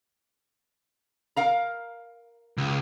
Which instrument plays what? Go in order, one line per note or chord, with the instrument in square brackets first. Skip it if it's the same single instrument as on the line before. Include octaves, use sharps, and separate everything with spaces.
[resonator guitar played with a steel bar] A#4 F5 A#5
[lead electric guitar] C#2